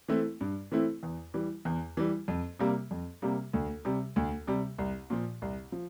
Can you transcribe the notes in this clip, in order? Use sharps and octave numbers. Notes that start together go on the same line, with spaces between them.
E3 A3 C4 E4
G2
E3 A3 C4 E4
E2
E3 G3
E2
E3 G3
F2
C3 G3 A#3
F2
C3 G3 A#3
D2
C3 G3
D2
C3 G3
C2
A#2 F3
C2
F3